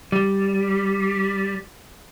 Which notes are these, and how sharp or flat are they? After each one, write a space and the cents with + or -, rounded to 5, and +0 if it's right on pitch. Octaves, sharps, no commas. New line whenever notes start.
G3 +0